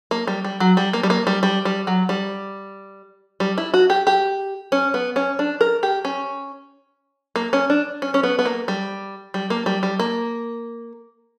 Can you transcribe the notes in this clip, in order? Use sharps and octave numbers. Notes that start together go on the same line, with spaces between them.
A#3
G3
G3
F#3
G3
A#3
G3
A#3
G3
G3
G3
F#3
G3
G3
E4
F#4
G4
G4
C#4
B3
C#4
D4
A#4
G4
C#4
A#3
C#4
D4
C#4
C#4
B3
B3
A#3
G3
G3
A#3
G3
G3
A#3